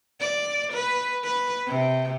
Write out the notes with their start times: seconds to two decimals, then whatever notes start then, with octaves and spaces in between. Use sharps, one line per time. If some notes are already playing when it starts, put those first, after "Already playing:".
0.20 D5
0.73 B4
1.24 B4
1.67 C3